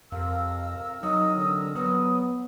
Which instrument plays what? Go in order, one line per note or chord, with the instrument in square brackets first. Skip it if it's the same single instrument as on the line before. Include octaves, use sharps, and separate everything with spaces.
[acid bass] F2 [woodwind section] C3 A#4 E6 [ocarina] F5
[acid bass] F#3 [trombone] D#4 [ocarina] D#6
[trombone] D3
[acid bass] F#3 [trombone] B3 [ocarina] D#6